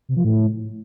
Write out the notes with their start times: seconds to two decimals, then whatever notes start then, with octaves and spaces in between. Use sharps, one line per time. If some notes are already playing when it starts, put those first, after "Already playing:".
0.09 C3
0.17 F3
0.25 A2